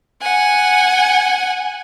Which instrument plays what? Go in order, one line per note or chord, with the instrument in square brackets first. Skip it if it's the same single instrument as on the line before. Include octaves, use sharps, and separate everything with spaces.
[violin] F#5 G#5